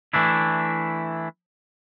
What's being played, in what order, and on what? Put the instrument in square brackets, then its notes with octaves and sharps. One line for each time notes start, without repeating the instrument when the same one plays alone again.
[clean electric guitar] E3 A3 D4 E4